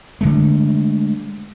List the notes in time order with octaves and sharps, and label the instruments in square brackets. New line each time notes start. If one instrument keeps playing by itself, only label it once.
[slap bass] D3 G#3 A3